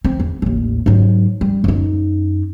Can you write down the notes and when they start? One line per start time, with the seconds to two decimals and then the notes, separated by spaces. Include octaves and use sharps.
0.04 C4
0.20 E2
0.42 A1 D#2
0.86 G#2 F#3
1.41 G3
1.64 F#2 D#4